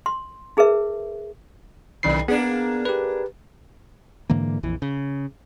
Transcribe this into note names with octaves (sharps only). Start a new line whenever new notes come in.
C6
D#4 G#4 A#4 B4 E5
B1 C3 D#3 E3 C7
A#3 B3 D4 G#4
G4 B4
G#2 D3 E3 A#3
A#1 F2 E3
C#3